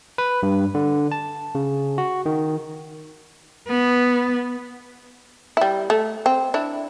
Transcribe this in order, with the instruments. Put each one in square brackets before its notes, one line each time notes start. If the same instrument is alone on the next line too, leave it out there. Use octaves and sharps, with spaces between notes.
[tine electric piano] B4
G2
D3
A5
C#3
F#4
D#3
[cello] B3
[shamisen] G3 E4
A3
C4
D4 E4